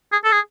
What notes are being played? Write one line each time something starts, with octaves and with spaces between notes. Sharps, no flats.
G#4
A4
G#4